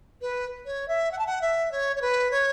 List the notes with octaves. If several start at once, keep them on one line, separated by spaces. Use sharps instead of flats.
B4
C#5
E5
F#5
A5
F#5
E5
C#5
C#5
B4
C#5